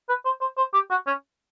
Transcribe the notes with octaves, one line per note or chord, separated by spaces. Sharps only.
B4
C5
C5
C5
G4
F#4
C#4